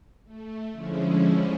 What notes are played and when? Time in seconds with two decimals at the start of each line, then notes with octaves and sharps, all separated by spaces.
0.25 A3
0.72 D3 F3 G#3 C#4 E4